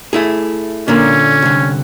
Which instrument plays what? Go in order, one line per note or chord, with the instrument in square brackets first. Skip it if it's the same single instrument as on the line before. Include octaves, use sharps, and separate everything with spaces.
[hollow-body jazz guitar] A3 E4 G#4
[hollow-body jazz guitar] A#2 D3 A#3 [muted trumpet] C#4
[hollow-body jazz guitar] C2 D3